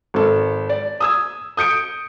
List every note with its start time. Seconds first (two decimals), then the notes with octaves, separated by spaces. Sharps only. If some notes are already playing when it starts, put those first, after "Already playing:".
0.14 G#1 A4
0.69 D5
1.00 D#6 E6 G#6
1.57 D#6 G6 C#7 D7